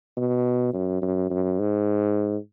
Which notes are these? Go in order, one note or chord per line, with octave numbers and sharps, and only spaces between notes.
B2
F#2
F#2
F#2
G#2